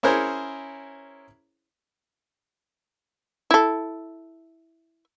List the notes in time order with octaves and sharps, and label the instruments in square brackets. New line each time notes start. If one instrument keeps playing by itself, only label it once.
[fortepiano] C#4 E4 G#4 A#4 C5 C#5
[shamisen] E4 A4